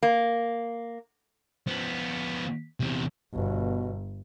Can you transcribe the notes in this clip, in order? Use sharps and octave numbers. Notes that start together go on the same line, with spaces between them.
A#3
F3 B3
E2 C3
G1 B2